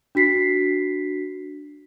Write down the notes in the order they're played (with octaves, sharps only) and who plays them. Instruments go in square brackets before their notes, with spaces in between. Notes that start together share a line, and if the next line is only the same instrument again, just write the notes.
[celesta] D4 F#4 B6 C7